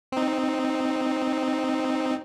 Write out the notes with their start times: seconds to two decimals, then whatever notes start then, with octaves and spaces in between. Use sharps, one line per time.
0.12 C4 D#4